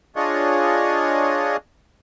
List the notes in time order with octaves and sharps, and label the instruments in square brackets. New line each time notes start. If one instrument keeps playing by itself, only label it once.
[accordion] D4 F4 G#4 C#5 D#5